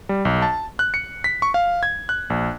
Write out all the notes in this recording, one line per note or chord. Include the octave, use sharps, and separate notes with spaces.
G3
B1
A5
F#6
C#7
B6
C#6
F5
G#6
F#6
A#1